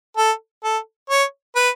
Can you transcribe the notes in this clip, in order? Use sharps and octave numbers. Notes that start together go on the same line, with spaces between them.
A4
A4
C#5
B4